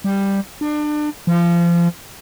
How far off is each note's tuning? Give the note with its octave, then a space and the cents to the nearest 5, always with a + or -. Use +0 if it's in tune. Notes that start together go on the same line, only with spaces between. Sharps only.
G3 +5
D4 +30
F3 -30